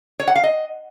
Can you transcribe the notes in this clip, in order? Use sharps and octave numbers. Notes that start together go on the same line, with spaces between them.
C#5
F#5
F5
D#5